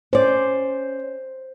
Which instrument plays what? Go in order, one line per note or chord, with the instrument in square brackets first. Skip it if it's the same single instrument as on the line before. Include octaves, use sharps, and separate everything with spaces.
[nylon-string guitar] C#4 D5 [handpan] C5